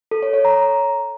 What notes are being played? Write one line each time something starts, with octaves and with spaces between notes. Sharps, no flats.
A4
C#5
C#5
A#5